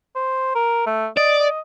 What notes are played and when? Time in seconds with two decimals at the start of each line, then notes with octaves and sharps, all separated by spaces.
0.16 C5
0.55 A#4
0.87 A3
1.17 D5 D#5
1.40 D#5